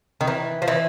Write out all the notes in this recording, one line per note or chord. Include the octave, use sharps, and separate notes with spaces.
D#3
E3
F3
E3